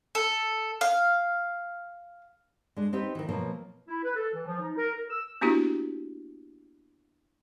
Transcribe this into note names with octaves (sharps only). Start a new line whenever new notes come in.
A4
F5
G#3 D4
C4 D#4 G4 B4
D#3 E3
B2 F3 F#3 A#3
E4
B4
A4
E3
F3
D#4
A#4
A#4
E6
A#3 B3 D4 E4 F#4 G4